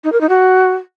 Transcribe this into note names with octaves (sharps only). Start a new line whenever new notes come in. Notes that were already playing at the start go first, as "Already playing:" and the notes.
D#4
A#4
D#4
F#4